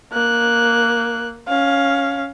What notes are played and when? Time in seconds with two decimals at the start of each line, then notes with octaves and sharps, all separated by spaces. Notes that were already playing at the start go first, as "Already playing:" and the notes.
0.12 A#3 F#6
1.48 C#4 F5